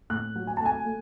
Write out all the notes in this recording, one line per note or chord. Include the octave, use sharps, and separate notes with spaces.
A2 F#6
F#3
G#5
A3 A5
G#5
A3